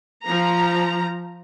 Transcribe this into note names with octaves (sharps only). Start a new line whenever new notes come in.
F3 A#5